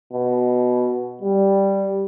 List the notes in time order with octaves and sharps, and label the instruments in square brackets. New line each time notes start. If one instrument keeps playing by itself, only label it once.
[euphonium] B2
G3